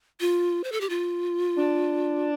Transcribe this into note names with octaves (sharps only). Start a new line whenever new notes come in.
F4
C5
A4
G4
F4
D4